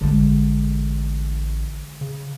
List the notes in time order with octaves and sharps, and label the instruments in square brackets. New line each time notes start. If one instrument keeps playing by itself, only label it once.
[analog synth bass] A1 [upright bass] D3 G#3
[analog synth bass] C#3